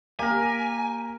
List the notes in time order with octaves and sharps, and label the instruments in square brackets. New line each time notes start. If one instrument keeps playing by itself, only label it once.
[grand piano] A#3 [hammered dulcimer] G4 A#4 [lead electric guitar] G#5